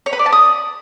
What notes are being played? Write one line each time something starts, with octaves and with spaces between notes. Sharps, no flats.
C#5
B4
D5
A5
D#6